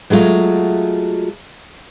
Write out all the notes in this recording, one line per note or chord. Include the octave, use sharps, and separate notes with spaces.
F#3 G#3 A3 F4 F#4